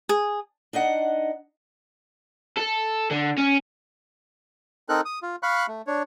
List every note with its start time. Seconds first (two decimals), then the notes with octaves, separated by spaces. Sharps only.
0.09 G#4
0.73 D4 D#4 D#5 F#5
2.57 A4
3.11 D3
3.38 C#4
4.89 C4 D#4 A4 A#4 F#6
5.05 D#6
5.23 F4
5.43 F5 B5 C#6 F#6
5.68 A3
5.87 D4 C#5